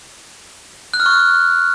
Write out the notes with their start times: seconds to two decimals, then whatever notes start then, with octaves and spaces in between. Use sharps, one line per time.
0.94 F#6
1.00 F6
1.06 C#6